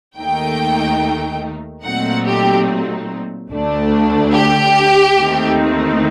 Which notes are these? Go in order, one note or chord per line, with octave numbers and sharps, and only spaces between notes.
D#2 D#3 A3 D#4 G5
A#2 F#3 A3 C4 D#4 F#5
G4
D2 D3 A3 D4
G4
D#2 D#3 A3 C4 D#4